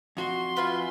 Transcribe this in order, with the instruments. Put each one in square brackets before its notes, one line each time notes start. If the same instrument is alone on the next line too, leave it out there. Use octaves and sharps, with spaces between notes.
[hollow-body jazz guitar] F2 F#4 [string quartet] C6
[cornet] F4 [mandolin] B4 E5 G#5